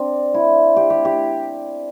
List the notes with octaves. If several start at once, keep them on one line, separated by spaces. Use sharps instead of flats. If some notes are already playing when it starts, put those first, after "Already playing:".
Already playing: C4 D4
E4
G4
G4
G4